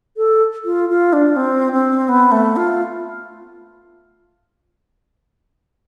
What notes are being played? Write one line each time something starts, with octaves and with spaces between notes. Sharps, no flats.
A4
F4
F4
D4
C4
C4
B3
A3
F4